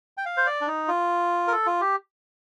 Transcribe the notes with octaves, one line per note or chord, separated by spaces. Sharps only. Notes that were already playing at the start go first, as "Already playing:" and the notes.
G5
F5
C5
D5
D4
D#4
F4
A#4
A4
F4
G4